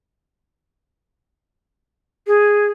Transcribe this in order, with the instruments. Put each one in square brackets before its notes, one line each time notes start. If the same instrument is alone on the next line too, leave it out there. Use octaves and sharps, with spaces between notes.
[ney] G#4